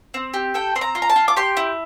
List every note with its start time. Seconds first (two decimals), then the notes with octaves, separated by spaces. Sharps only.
0.14 C4
0.34 G4
0.54 A4 G5
0.76 C4 C6
0.81 A#5
0.95 F4
1.02 A#5
1.09 A5
1.16 F4
1.28 D6
1.36 G4 C6
1.57 E4